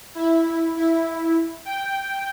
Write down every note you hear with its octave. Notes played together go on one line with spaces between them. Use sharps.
E4
E4
G5